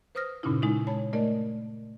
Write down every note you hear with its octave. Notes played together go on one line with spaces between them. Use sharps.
B4 C5 D#6 F6 A#6
G2 A#2 C#3 C#4 D#4 E4
G#3 D#4 E4
C#5 A5 B5
A3 A#4 D5 D#5